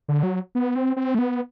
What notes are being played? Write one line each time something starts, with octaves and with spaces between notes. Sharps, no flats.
D3
F#3
B3
C4
C4
A3
B3